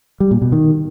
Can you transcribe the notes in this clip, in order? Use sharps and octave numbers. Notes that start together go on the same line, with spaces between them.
G3
A#2
B2
D#3